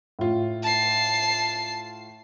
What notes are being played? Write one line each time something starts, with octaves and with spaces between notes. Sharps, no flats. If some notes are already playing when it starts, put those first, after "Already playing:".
A2 F4
A5 C7